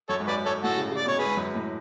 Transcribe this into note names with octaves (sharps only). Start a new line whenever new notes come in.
F#2 A4 C#5
G#2
F#2 B4 D5
G#2 A4 C#5
A2 F#4 A4
C#3
C#3
D5
B2 C#5
G#4 B4
G#2
F#2
A2